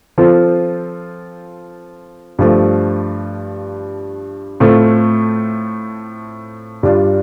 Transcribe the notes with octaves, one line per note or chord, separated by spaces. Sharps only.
F3 C4 F4 A4
G2 F3 A3
A2 A3 C4 F4 A4
G2 G3 D4 F4